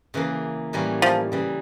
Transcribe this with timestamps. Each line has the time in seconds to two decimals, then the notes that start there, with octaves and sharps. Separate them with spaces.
0.14 C#3 E3 A#3
0.73 A2 E3 G3 A#3 C#4
1.02 F3
1.32 C#3 E3 G3